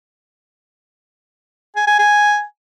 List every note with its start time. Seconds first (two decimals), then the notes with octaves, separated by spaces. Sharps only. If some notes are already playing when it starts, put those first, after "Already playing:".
1.76 G#5
1.87 G#5
1.99 G#5